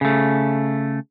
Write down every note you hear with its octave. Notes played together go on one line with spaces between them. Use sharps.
C#3 A3